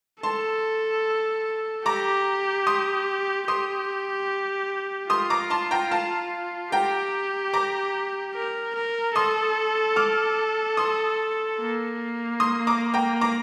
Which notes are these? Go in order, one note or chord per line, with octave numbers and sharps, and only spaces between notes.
A4 A5 C6
G4 A#5 D6
C6 D#6
G4 C6 D#6
F4 C6 D#6
A#5 D6
A5 C6
G5 A#5
F5 A5
G4 G5 A#5
A#5 D6
A#4
A#4
A4 C6 D#6
D6 F6
C6 D#6
A#3
C6 D#6
A#5 D6
G5 A#5
A#5 D6